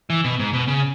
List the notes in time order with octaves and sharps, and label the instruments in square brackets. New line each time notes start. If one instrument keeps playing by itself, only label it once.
[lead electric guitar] E3
B2
G#2
B2
C#3